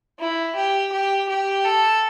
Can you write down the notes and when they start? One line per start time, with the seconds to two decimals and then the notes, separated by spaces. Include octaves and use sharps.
0.19 E4
0.56 G4
0.92 G4
1.29 G4
1.65 A4